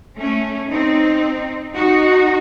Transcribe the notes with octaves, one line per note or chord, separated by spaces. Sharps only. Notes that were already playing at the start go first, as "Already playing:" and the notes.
A3 C#4
C4 D#4
D#4 F#4